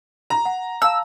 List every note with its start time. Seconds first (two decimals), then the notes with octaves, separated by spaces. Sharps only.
0.30 A#5
0.45 F#5
0.82 F5 A5 E6